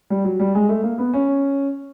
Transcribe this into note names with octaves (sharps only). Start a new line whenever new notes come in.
G3
F#3
G3
G#3
A3
A#3
B3
C#4